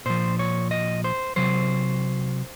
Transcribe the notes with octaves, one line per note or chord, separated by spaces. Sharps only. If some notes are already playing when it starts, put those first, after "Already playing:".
A#2 F3 C5
C#5
D#5
C5
C3 F#3 C5